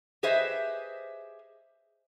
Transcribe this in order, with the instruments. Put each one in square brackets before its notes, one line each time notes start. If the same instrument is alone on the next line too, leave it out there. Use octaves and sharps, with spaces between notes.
[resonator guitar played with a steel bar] G4 G#4 B4 C5 D#5 E5